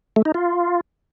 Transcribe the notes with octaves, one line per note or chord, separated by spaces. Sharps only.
A3
D#4
F4